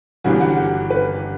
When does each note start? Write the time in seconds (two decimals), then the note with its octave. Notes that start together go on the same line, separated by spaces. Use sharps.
0.24 G1 G2 E3 F#4
0.41 F#4
0.57 G4
0.90 B4